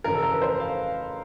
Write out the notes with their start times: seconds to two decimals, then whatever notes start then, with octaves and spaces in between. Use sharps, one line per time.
0.04 F2 C#3 E3 A#4
0.14 A4
0.23 A#4
0.32 B4
0.42 C5
0.60 F5